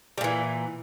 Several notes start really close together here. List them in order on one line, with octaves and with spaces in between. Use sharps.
G3 A#2 E3